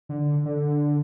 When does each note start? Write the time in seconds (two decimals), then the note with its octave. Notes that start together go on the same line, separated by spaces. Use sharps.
0.09 D3
0.46 D3